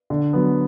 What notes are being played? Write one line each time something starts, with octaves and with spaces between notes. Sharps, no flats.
D3
F#3 B3